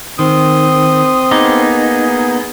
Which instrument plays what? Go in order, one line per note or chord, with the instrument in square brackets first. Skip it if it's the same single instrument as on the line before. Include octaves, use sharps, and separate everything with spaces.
[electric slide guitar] D#3 [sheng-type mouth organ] C4 C6 [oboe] D#6
[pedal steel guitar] A#3 B3 D6 [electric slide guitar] D#4 [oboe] G#4